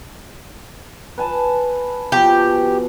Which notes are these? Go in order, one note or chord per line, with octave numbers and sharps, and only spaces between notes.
B4 G#5 A5
B2 F3 G4